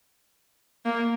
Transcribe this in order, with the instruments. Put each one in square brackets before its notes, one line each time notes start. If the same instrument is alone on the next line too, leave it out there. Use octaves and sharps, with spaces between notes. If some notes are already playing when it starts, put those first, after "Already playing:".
[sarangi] A#3